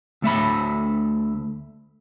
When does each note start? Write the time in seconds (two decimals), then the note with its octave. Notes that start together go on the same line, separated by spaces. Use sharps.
0.22 D2 A3 E5 B5